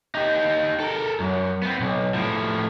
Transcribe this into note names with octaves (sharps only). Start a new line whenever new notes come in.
D#4 G4
A4 A#4
F#2
B3 C4
B1
A2 F3